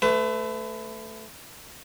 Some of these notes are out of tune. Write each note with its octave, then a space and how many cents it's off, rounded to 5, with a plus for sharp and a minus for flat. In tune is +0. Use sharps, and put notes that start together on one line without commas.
A3 +0 B4 +30